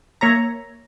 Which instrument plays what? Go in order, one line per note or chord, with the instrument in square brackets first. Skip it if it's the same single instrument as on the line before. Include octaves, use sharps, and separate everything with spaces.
[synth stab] A#3 C#5 E5 A#5